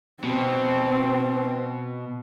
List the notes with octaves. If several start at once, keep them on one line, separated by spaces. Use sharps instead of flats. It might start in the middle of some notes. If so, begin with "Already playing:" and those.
B2 C4